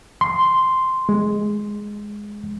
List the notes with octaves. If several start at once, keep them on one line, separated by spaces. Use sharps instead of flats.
C6
G#3